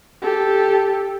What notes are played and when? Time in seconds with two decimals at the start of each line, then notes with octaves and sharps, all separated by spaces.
0.22 G4 A4